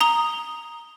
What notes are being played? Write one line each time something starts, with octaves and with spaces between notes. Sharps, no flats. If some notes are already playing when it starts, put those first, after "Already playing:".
A#5 D#6 G7